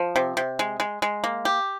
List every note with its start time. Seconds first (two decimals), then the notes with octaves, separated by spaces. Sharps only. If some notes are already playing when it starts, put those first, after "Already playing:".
Already playing: F3
0.16 C3
0.37 C3
0.59 G#3
0.80 G#3
1.02 G#3
1.24 A#3
1.45 G4